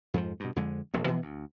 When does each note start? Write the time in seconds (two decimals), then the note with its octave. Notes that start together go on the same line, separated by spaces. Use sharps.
0.14 F2 G#2 F3
0.40 G2 B2
0.56 F2 D3 G#3
0.94 E1 A#1 F2
1.06 B2 E3 F3 B3
1.22 D2